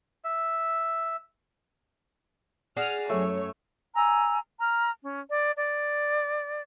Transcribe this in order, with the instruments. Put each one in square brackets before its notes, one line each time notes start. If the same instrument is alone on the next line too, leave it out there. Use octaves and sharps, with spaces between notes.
[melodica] E5
[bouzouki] F#4 G#4 D5 [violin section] F6
[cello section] F#2 F#3 [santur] A3 [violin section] C#5
[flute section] G#5 A#5 E6
A#5 F6
C#4
D5
D5